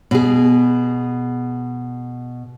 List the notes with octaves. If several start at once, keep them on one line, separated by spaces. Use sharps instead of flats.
B2 G#4